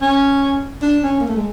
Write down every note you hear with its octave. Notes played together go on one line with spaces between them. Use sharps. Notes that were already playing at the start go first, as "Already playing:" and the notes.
C#4
D4
C#4
A#3
A3
G#3